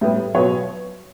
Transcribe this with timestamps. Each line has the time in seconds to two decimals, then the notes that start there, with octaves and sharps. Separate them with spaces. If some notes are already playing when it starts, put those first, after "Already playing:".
0.01 A2 G3 B3
0.35 B2 F#3 B3 C#5